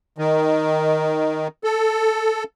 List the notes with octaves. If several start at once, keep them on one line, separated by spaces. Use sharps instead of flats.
D#3
A4